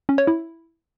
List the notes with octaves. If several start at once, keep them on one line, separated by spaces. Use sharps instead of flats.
C#4
C#5
E4